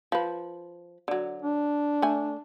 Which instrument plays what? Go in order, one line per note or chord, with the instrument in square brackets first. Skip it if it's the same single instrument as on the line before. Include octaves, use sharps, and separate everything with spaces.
[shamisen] F3 B4
D3 F#3
[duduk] D4
[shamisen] A3 G#5